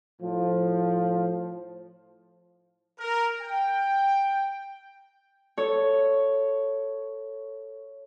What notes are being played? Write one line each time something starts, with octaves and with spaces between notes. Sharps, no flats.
A2 F3
A#4
G5
A4 C#5